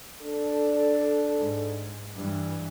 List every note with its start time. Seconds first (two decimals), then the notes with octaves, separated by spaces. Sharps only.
0.22 D4 A4
1.37 G#2
2.14 G2 E3